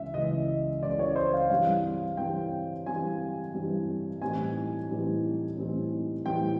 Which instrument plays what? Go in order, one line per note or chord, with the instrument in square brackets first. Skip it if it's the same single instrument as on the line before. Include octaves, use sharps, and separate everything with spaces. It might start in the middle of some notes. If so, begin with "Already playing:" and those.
Already playing: [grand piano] C#2 C#3 E3 E5
C#2 C#3 E3 D#5
C#2 C#3 E3 D5
C#5
C5
F5
G2 E3 G3 C4 F5
G2 E3 G3 C4 G5
G2 E3 G3 C4 G#5
G2 E3 G3 C4
A2 E3 G3 C4 D#4 G#5
A2 E3 G3 C4 D#4
A2 E3 G3 C4 D#4
A2 E3 G3 C4 D#4 G5